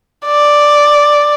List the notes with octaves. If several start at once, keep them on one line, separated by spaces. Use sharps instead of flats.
D5